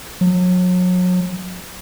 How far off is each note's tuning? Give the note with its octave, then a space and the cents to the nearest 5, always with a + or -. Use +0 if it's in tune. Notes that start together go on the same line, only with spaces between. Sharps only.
F#3 -35